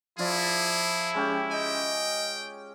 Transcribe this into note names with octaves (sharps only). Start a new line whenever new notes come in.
F3 E4 F4 G#4 D5
G#3 C#4 G4
D#5 G5